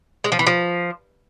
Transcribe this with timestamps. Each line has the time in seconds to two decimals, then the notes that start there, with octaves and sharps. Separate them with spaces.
0.24 G#3
0.32 F3
0.39 E3
0.47 F3